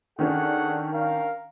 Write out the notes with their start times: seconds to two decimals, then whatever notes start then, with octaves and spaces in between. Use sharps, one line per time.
0.19 D#3 C#4 D4 G#4 A4 F#5
0.94 A#4 F5